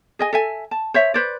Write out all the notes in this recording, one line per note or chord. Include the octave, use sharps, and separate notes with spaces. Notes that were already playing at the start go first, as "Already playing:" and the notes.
G#4 D#5 G#5
A4 E5 G#5
A5
C5 C#5 E5
B4 C5 D5